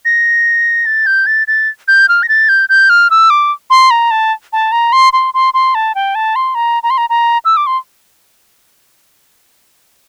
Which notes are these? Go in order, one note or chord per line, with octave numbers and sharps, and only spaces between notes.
A#6
A6
G6
A6
A6
G6
F6
A#6
A6
G6
G6
F6
E6
D6
C6
A#5
A5
A5
A#5
C6
C6
C6
C6
A5
G5
A5
C6
A#5
A#5
C6
A#5
A#5
E6
D6
C6